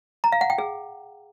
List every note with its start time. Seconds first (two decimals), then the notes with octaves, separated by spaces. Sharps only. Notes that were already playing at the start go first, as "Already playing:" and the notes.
0.24 A#5
0.32 F5
0.41 F#5
0.50 G5
0.58 G#4